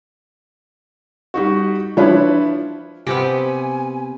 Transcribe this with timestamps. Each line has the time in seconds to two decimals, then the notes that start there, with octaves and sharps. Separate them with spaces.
1.34 G3 D#4 F#4
1.97 F3 D4 E4 B4 C#5 B5
3.07 C3 B3 C4 G4 G#5